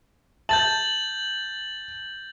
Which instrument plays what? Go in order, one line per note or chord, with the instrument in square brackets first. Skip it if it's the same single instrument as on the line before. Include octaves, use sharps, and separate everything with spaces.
[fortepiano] A5 [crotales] G6 A6 F#7